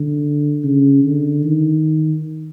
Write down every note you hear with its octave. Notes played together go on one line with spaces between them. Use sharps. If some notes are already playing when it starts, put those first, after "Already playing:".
Already playing: D3
C#3
D3
D#3